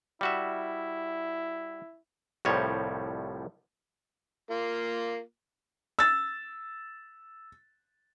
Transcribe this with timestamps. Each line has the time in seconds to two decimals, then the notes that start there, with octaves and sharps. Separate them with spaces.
0.21 G3 E4 F#4 E5
2.45 C2 A2 F3 G3 C#5
4.51 A#3 F4
5.99 E6 A6